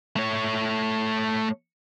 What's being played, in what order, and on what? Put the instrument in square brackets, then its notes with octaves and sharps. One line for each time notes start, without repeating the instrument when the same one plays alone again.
[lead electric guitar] A3 C#5